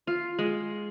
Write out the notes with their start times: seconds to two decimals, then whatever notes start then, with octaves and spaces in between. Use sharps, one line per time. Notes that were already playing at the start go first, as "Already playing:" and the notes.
0.07 F4
0.39 G#3